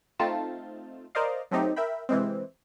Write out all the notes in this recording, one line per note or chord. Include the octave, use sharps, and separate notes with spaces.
A3 C4 D#4 F4 A5
A#4 C5 D5 D#5 F5
F#3 A3 C4 D#4 G4
A#4 E5 G5 B5
C3 E3 G#3 C4